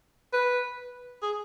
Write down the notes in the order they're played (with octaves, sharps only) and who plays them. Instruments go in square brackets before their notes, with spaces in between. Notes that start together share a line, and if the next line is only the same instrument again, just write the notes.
[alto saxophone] B4
G#4